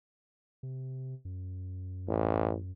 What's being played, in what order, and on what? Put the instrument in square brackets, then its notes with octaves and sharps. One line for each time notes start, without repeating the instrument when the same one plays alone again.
[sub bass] C3
F#2
[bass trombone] A1